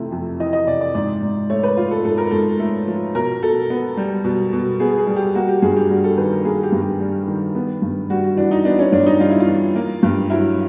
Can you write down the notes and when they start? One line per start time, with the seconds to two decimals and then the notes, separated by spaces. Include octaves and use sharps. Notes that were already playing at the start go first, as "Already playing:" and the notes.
Already playing: F2 C3 E3 A3
0.12 F2
0.40 E3 D#5
0.53 D#5
0.67 C3 D5
0.81 D5
0.95 G#2 D5
1.22 G#2
1.50 A3 C#5
1.63 B4
1.77 F3 F4
1.91 A4
2.05 G#2 A4
2.17 A#4
2.31 G#2 A4
2.59 A3
2.87 F3
3.15 B2 A#4
3.42 B2 A4
3.70 B3
3.97 G3
4.24 B2
4.53 B2
4.80 B3 G#4
4.98 G#4
5.07 G3
5.16 G4
5.35 A#3 F#4
5.49 G4
5.62 G2 G#4
5.76 G4
5.90 G3 F#4
6.04 A4
6.17 D#3 B4
6.32 A#4
6.45 A#3 G#4
6.63 G4
6.72 G2
6.82 G4
7.00 G3
7.28 D#3
7.55 B3
7.82 G2
8.10 G3 F#4
8.24 F#4
8.37 E3 D4
8.51 D#4
8.65 B3 D4
8.79 C#4
8.92 G2 D4
9.06 D#4
9.20 G3 F4
9.30 E4
9.40 F4
9.48 E3
9.75 A#3
10.03 G2
10.30 F#3 E4